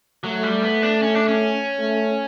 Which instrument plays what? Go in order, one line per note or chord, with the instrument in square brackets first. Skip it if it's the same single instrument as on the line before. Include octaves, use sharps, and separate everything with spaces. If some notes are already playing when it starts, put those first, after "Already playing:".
[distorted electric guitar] F#3 [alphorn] A3
[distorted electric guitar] G3
B3
D4
C#4
D4
C#4
[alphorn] A3